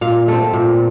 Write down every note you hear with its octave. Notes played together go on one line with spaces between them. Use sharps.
A#2 F5
A3 C4
A#2